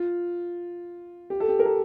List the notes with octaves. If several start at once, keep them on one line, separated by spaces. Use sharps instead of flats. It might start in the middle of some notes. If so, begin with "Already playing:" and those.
Already playing: F4
G4
A4
G4
A#4
A4